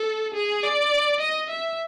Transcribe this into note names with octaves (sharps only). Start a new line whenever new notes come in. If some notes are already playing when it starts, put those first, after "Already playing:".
Already playing: A4
G#4
D5
D#5
E5